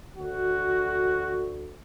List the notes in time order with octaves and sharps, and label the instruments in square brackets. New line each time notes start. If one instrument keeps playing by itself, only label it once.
[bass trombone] D2 [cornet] F#4